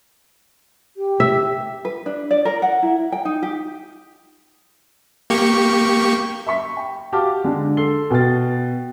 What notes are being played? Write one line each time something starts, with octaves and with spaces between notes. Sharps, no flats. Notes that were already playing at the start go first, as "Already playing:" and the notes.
G4
E5
B4
D4
D5
A#4
F#5
E4
G5
D#4
G4
A#3 G4 C#6
E5 B5 C#6 B6
G5
F#4 G4 F5 A5 D6 F6
D3 G#3 D4
A4 C6 C7 G7
B2 G5 F6 A6